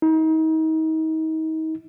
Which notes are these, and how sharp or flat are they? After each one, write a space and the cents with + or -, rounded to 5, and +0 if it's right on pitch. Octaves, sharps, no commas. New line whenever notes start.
D#4 +35